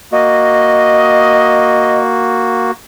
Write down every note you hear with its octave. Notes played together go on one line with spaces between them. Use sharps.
A#3 F#4 D#5